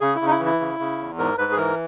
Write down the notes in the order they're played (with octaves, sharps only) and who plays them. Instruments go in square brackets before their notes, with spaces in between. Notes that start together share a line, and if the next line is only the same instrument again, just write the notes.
[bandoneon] C#3 G#4
E4
C#3
D#4
E4
E3
E4
C#3
C#3
E2
G#2 A#4
G#2 B4
G#4
E3 A#4